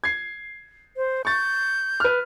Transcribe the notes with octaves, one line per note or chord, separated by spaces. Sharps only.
G#6 C7
C5
C#6 G6 A6
B4 F6